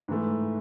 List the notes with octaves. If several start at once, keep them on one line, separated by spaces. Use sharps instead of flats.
G#2 E3 A3